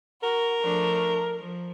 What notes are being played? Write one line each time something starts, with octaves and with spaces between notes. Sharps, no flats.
F#4 A#4
F3 A3 D4
F3